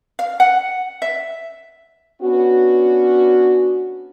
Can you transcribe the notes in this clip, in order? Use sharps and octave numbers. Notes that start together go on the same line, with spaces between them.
F5
F#5
E5
B3 C#4 D4 F#4